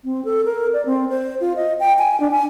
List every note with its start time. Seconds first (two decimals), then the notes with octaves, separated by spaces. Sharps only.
0.04 C4
0.25 A4
0.45 A#4
0.73 D5
0.86 C4
1.09 C5
1.41 F4
1.56 D#5
1.80 G5
1.99 G#5
2.20 D4
2.32 G#5